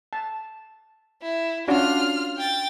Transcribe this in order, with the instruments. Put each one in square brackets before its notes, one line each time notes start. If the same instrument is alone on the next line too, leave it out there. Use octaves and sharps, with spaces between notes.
[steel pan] A5
[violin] E4
[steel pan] C#4 D4 F#4 [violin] F4 F6
[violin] G5 A6